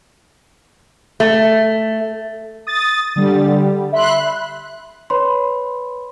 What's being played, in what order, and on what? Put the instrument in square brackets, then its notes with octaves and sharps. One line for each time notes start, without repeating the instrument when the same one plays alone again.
[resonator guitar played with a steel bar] A3
[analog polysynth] D#6 A6
D3 G3
E5 B5 C6 F#6
[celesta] B4 C#5 B5 C6